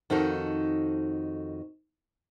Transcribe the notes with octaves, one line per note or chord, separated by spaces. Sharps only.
F2 D#3 D#4 F#4 A4